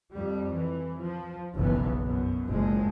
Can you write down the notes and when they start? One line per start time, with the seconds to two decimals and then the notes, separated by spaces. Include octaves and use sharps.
0.12 F2 G3
0.52 E3
1.00 F3
1.55 F#1 B1 E3 B3
2.02 F#2 B2
2.47 F#1 F3 G#3